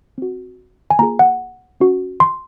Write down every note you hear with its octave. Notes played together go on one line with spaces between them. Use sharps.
C4 F#4
G#5
A#3 F4 G#4 A#5
F#5
C#4 F#4
C6